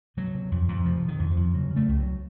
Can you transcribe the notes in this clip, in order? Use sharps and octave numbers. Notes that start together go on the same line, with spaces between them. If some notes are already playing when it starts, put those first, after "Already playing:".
C3 F#3
C3
F2
F2
C3 F3
C3
D#3
F2
F3
F2
C#3 F#3
C#3
A3
C#2
F#3